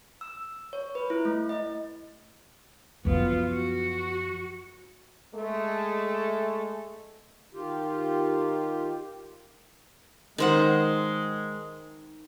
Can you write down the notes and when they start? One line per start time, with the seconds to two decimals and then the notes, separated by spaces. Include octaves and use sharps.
0.21 E6
0.73 C#5
0.95 B4
1.10 E4
1.25 A3
1.49 D#5
3.05 F#2 F3 B3 F4
3.51 F#4
5.34 G#3 A3
7.54 D#3 F4 G4
10.38 D#3 G#3 C5 F#5